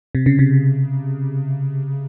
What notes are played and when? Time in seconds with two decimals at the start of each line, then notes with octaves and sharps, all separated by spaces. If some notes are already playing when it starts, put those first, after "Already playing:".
0.15 C3
0.26 C#3
0.39 C3